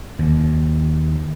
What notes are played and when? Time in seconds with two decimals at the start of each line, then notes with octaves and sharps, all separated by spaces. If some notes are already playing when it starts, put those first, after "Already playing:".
0.19 D#2